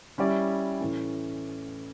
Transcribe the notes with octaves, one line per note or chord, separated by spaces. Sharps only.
G3 C#4 E4 G4 D5
A2 E3 A3 C#4